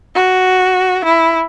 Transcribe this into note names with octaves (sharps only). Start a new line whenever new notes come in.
F#4
E4